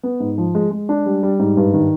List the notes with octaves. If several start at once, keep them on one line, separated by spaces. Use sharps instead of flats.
B3
G#2
F3
G#3
G#3
D4
G3
G3
G#2
G2
D#3